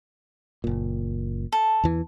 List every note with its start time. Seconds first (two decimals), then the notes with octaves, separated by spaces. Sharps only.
0.64 F#1 A#2
1.52 A4
1.84 E2 E3